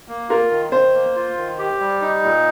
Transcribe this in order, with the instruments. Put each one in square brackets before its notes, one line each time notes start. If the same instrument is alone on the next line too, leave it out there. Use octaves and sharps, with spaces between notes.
[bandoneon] A#3
[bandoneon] F4 [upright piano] A#4
[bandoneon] D#3
[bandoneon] D#3 [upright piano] C5
[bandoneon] A#3
F4
D#3
G4
G3
D#4
A#2